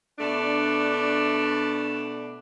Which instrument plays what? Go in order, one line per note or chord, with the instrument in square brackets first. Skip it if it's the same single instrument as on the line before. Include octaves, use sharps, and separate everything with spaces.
[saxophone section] B2 A3 D4